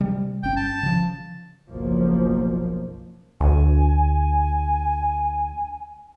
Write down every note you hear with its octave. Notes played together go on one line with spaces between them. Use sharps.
C3 G3
G1 C#4 G5
A5
C#3 F3
F#1 B1 F3 A#3
D2 G#5